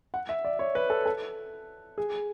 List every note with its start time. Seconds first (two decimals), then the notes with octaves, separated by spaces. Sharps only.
0.14 F#5
0.29 E5
0.45 D5
0.59 C#5
0.75 B4
0.90 A4
1.05 A4
1.98 G#4